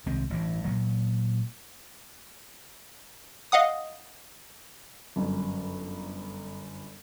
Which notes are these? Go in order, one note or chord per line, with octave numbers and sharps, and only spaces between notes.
C2 D#3 G#3 C4
A1 G2 E3
A#2 F#3
D#5 F5 F#5 D#6
G1 F#2